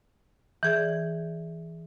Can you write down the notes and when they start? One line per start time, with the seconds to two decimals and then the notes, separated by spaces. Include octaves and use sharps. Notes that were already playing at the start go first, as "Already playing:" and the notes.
0.63 E3 G#4 D5